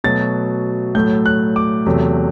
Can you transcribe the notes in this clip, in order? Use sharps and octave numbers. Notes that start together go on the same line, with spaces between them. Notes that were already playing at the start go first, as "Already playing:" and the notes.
B2 F#3 A3 A6
A2 F#3 A3 G6
F#6
D6
E2 C3 F#3 A3